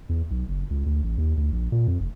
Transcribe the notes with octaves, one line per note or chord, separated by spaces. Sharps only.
E2
B1
F#1
C#2
D2
A1
D#2
D2
A#1
A#2
F2
F1